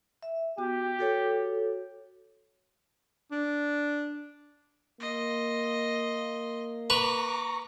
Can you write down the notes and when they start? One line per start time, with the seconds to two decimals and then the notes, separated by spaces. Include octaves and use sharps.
0.23 E5
0.58 B3 F#4 G4
0.99 F#4 A4 C#5
3.31 D4
5.00 A#3 D#5 C6
6.90 B4 A#5 C#6 D6